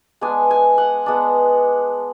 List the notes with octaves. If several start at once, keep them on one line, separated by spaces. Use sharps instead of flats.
G#3 B3 D4 G#5
G#5
F#5
G#3 B3 D4